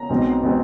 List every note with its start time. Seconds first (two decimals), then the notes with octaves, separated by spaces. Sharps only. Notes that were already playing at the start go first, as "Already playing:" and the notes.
Already playing: A#5
0.09 B1 B2 G#3 C4
0.43 B2 G#3 C4